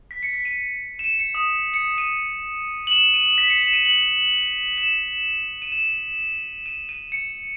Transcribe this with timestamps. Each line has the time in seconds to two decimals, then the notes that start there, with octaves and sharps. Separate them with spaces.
0.11 B6
0.23 C#7
0.33 B6
0.45 D#7
0.99 E7
1.04 D#7
1.20 C#7
1.35 D#6
1.74 C#7
1.98 D#7
2.87 F#7
2.91 E7
3.14 D#7
3.38 B6
3.50 C#7
3.62 E7
3.73 D#7
3.85 F#7
4.78 E7
5.62 D#7
5.72 E7
6.66 D#7
6.89 D#7
7.12 C#7